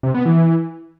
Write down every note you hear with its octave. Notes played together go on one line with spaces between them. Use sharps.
C3
B3
E3